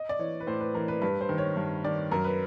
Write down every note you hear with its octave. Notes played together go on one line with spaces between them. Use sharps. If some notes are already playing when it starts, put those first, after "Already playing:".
Already playing: D#5
D5
E3 C#5
B4
A2 C5
B4
E3 A#4
B4
G2 B4
C5
D#3
C#5
G2
D#3 D5
F#2 A#4
B4